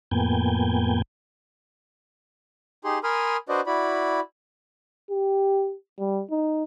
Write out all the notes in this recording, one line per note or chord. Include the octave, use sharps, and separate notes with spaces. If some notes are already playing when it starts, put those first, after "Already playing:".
F2 A2 A#3 B3 G5 G#5
D#4 G4 G#4 C6
A#4 G#5 B5 C6 D#6 F6
D4 F#4 B4 C5 D5 D#5
E4 F#4 D5 B5
G4
G3
D#4